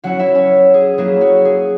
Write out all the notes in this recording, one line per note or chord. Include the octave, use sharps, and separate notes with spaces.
F#3 C#4 E4 F#4 F#5
E4 E5
C#4 C#5
G#4
F#3 A#3 E4 G#4
F#4
G#4